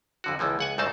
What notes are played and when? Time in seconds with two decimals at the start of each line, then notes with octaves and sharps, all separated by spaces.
0.24 F2 D3 F#4
0.39 C#2 E3 F3 A#3
0.59 C#2 F#5 G#5
0.78 C2 G#2 A3 D#4 C5 A5